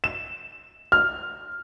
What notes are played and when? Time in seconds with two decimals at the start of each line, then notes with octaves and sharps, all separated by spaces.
0.04 E7
0.92 F6